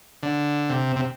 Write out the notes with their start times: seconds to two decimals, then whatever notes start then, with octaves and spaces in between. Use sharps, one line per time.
0.23 D3
0.70 C3
0.96 C3